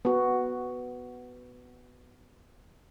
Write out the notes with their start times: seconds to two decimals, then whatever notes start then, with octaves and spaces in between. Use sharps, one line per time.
0.05 B3 F#4